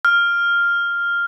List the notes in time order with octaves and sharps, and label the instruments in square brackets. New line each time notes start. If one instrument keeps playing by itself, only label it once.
[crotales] F6